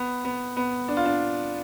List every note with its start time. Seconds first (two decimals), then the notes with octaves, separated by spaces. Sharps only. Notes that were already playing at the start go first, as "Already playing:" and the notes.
Already playing: B3
0.25 B3
0.57 B3
0.88 D4
0.97 F4
1.06 D4